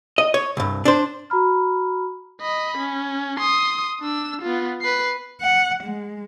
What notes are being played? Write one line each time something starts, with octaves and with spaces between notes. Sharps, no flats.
D#5
C#5
C2 G2
D4 C5
F#4 A#5 B5 F6
D#5 B5
C#4
C6 D#6
D4 E6
B3 F4
B4 C7
F#5
G#3